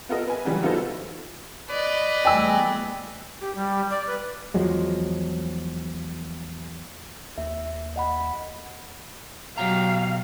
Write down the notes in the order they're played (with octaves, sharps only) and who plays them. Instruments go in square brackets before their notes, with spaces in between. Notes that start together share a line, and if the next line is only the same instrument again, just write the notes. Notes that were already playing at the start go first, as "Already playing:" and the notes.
[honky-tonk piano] B3 F4 A4 A#4 D#5
B4 G#5
G#2 C#3 E3 F#3 G3
B3 D#4 F4 F#4 A4 C5
[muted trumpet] B4 [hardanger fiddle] D5 D#5
[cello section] E2 G3 A3 [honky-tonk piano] G5 G#5 E6
[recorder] G4
G3
D5
B4
[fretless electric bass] E2 F3 F#3 G#3
[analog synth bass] D#2 [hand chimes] E5
[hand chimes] D#5 F#5 B5
[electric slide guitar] B2 G4 A#5 [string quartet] F#3 [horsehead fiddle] F5